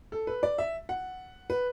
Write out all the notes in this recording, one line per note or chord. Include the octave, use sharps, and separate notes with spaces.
A4
B4
D5
E5
F#5
B4